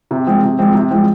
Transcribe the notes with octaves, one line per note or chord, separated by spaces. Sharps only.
C3
F3 G#3 C4
C3
F3 G#3 C4
C3
F3 G#3 C4